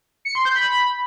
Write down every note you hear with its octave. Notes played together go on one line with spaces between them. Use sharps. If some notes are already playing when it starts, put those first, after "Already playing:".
C#7
C6
G6
B5